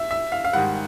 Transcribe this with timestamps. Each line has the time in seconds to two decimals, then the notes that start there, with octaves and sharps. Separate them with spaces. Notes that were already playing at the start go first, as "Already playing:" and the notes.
Already playing: E5
0.11 E5
0.32 F5
0.45 F5
0.53 G#2 D#3 G3 F#5